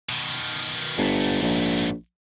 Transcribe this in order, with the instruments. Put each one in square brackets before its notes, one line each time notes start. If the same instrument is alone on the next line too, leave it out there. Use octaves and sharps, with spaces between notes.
[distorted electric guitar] B2 D#3
[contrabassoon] G1 [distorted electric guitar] G#2 A3
[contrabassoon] A#1